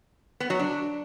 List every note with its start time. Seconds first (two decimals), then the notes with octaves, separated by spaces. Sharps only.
0.40 B3
0.50 F#3
0.59 D4